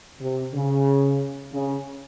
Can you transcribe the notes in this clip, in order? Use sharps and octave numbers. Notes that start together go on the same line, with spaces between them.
C3
C#3
C#3